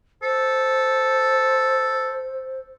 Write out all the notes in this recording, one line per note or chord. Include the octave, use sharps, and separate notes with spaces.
A4 C5